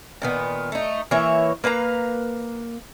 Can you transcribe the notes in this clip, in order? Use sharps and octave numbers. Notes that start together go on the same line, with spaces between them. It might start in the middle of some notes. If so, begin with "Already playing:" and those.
A#2 D#3 B3
A3 D#4
E3 A#3 C#5 E5
A#3 B4 F5 A#5